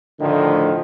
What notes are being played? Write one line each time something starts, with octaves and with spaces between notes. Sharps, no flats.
A2 D3 D#3 F3 A3